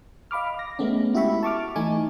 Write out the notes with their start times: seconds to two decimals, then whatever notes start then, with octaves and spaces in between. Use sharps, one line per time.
0.31 D#5 F5 B5 D6 F6
0.59 A#6
0.79 G#3 A3 B3 C#4
1.15 E4 F#4 G4 E5 B5 C#6
1.43 A5 C#6 D6 F6
1.76 E3 A3 D#4 G#5